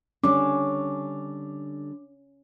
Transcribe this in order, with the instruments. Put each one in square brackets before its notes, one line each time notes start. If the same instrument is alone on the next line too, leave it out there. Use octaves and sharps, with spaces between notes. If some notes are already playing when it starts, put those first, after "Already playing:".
[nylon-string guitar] D3 G3 D4 [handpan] C#4 [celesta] D6